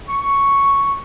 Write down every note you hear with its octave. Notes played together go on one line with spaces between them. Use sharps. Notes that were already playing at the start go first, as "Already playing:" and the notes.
C#6